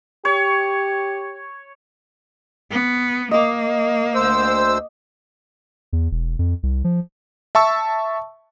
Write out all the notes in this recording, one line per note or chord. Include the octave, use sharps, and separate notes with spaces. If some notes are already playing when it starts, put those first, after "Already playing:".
G4 C#5
B3
A#3 D#5 D6
D2 C5 E6
E2
E1
F2
C2
F3
E5 A5 C#6 E6